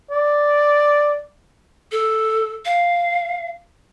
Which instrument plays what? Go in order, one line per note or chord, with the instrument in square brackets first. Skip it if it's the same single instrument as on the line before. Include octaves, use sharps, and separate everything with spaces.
[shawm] D5
[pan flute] A4
F5